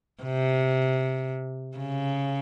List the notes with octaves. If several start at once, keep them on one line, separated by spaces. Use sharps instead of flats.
C3
C#3